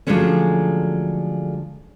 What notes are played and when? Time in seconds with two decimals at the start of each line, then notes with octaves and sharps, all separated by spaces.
0.07 D3 F3 F#3 G#3 A3 C#4